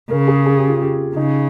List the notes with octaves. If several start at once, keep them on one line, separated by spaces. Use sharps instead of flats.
C#3 A#4
G#4
G#4
G4
F4
G4
C#3 D#4